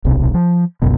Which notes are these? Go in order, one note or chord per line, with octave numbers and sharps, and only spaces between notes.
D1 B1 C3
F3
G#1 C#2 F#2 B2